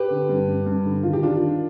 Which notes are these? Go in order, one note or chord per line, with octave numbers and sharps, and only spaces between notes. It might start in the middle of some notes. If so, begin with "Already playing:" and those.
Already playing: G4 B4
D3
G2
G2
G2
D3
D#3 F4
G4
D#3 D4 F4
D#3